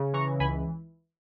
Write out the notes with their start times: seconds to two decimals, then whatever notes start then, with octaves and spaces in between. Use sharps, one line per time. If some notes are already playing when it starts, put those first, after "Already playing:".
Already playing: C#3
0.14 E3 A#5 C#6
0.40 C#2 G#5 B5